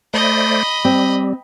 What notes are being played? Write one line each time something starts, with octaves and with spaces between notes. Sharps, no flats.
A3 C5 D5 D#5 B5
G3 C4